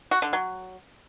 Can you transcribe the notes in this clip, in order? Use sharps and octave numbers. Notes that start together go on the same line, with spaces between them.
F#4
D3
F#3